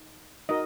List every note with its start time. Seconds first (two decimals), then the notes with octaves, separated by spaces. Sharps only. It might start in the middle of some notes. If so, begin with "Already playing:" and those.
Already playing: D#4
0.49 D#4 F#4 A#4 D#5